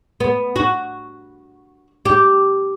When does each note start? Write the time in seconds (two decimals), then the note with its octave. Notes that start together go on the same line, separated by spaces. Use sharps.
0.20 B3
0.56 F#4
2.05 G4